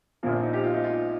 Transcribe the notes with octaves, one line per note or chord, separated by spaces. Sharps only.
A#1 A#2 F3 A#3
C4
D#4
G4
F4
D#4
F4